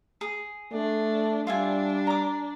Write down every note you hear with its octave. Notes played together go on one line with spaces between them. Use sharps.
G#4
A3 D4
G3 D4 F4 E5 G#5
A#5 D6